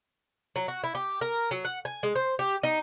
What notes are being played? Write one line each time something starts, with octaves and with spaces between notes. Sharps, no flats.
F#3
F#4
E4
G4
A#4
F#3
F#5
G#5
G#3
C5
G4
D#4